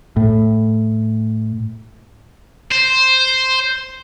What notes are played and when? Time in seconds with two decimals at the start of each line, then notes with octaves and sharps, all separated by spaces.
0.16 A2
2.72 C5